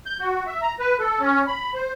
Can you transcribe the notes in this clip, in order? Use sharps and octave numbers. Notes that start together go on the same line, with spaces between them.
G6
F#4
E5
A#5
B4
A4
C#4
B5
C5